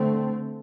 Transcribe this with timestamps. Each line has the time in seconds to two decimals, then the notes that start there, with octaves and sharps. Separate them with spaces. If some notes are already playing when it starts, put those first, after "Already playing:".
Already playing: D3 A3 C4